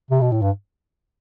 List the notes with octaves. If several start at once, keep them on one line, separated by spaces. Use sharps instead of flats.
C3
B2
A2
G2